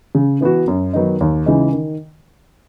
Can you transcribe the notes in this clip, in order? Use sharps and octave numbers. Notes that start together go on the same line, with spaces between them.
C#3
E3 B3 F#4
F#2
D#3 F#3 B3 D#4
D#2
C#3 E3 G#3 D#4
D#3